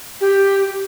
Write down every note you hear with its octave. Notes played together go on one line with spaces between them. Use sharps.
G4